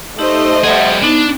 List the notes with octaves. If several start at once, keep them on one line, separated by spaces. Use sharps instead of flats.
A3 D#4 G4 C5 D#5 E6
G3 G#4 E5 F#5
B3 D4 D#4